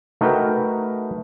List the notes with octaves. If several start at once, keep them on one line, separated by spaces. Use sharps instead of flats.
A3 D#4 F#4 A#4 B4 G5